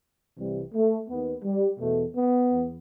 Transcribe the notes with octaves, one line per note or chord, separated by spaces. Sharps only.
C2 C3 E3 G3
A3
D#2 D#3 B3
G3
E2 B2 A3
B3
E2